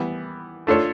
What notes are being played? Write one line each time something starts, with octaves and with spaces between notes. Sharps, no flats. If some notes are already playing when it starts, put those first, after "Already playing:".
Already playing: E3 G3 B3
A3 D4 F4 A4 C#5